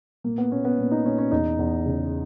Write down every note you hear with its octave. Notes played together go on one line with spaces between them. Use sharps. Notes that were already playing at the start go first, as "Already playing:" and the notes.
A#2 A#3
B3
A#2 C#4
B3
A#2
D#4
A#2 C#4
C#4
E2 D#4
E2
C#3